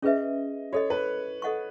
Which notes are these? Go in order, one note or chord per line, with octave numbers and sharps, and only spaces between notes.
C#4 G#4 B4 D#5 E5
F#4 A4 C#5 D#5
B4
A4 D#5 F#5 C#6